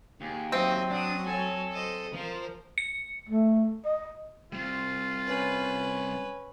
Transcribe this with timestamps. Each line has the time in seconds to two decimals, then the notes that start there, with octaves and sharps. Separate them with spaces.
0.21 D#2 G#4
0.52 F#3 C4 D#5 E5
0.90 D4 F#5 D#6
1.26 A4 C#5 G#5
1.72 C5 D#5
2.14 F3 A#4 C5
2.78 C#7
3.29 A3
3.85 D#5
4.52 G3 C4 F4
5.26 C#4 B4